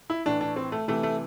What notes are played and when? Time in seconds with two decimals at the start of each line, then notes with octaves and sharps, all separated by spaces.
0.10 E4
0.25 A2 E3 D4
0.41 D4
0.56 C4
0.72 A3
0.88 C3 E3 A3
1.03 A3